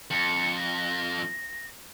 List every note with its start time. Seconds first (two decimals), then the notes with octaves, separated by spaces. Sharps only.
0.11 F2 C#7
0.56 A#6